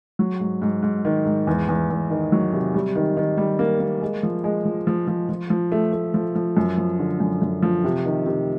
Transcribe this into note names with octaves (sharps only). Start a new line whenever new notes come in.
F#3
G#2
G#2
G#2
D#3
G#2
E2
E2
E2
D#3
F#3
C3
G3
D#3
D#3
G3
A#3
A#3
G#3
F3
G#3
F3
F3
F3
F3
F3
A3
A3
F3
F3
F#2
F3
D3
F#2
F#2
F3
C3
D#3
C3